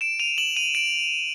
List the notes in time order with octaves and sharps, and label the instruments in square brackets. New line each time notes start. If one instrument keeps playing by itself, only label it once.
[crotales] D7 E7
D#7 F7
E7 F#7
D#7 F7
D7 E7